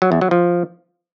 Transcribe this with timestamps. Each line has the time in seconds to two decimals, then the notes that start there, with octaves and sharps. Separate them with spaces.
0.02 F#3
0.12 E2
0.21 F#3
0.31 F3